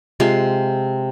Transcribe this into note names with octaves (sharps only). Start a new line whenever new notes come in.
C3 G#3 F4 F5